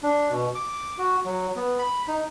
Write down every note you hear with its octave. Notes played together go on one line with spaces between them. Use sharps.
D4
B2
D6
F#4
F#3
B3
B5
D#4